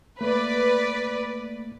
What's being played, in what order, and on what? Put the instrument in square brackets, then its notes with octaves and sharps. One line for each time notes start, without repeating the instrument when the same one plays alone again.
[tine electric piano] A3 A#3 [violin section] B4 D5